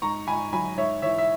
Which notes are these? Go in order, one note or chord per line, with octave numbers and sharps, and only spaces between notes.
G#2 A#5 C#6
G#2 G#5 B5
F#3 G#5 B5
G#2 C#5 E5
E3 C#5 E5
E5